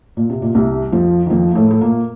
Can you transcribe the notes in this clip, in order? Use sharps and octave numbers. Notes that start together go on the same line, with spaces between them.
A#2
C3
A#2
C2 C3
F2 F3
D#3
F2 F3
A#3
A2 A3
A3
A#2 A#3